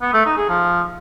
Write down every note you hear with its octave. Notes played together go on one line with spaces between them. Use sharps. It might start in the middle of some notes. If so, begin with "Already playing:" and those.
B3
A3
D#4
G#4
F3